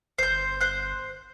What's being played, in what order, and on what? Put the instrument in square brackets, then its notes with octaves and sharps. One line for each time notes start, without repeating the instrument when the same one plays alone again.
[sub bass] G1 [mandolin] C5 G6
[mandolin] C5 F#6